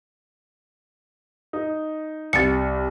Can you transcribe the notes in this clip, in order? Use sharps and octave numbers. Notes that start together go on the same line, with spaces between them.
D#4
C2 A6 C#7